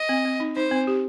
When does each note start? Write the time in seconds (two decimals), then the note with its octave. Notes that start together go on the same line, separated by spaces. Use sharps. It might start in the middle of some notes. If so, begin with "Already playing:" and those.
Already playing: D#5
0.09 C4
0.25 C4
0.40 D#4
0.56 D#4 C5
0.71 C4
0.87 G4